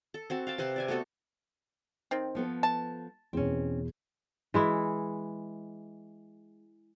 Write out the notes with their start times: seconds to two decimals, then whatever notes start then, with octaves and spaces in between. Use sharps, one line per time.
0.14 A4
0.30 C4 F#4 A5
0.47 F5 G5 A5
0.58 C3 C4 B4 C6
0.76 D5 E5 G#5
0.88 A3 B3 F#4 A4
2.11 D#3 C4
2.35 F3 B3 A4
2.63 A5
3.33 E2 B2 C4 C#4
4.54 E3 G#3 E4